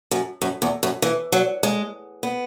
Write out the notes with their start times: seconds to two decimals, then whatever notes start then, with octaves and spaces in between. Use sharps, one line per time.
0.11 F#2
0.42 F#2
0.62 E2
0.83 F#2
1.02 E3
1.32 F#3
1.63 G#3
2.23 B3